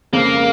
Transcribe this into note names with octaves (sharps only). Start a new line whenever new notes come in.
F2 C#3 G#3 A#3